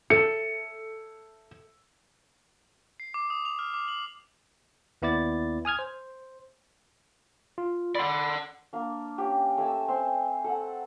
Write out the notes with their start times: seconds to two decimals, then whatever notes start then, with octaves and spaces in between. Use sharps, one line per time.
0.10 A4 E5 C#7
3.00 C7
3.14 D6
3.30 D#6
3.45 F7
3.59 F6
3.74 D6
3.88 F#7
5.02 D#2 B3 E4 D5 A6
5.65 G#5 D#6 F6 G#6
5.79 C5
7.58 F4
7.95 D5 F#5 B5 C6
8.73 A#3 D4
9.18 C#4 G4
9.58 A3 G#5 A5 E6
9.88 C4
10.44 A4 F#5